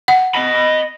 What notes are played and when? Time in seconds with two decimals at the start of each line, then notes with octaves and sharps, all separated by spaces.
0.08 F#5
0.35 D#5 B5